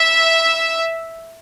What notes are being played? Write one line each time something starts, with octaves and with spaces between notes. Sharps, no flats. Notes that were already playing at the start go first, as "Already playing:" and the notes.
Already playing: E5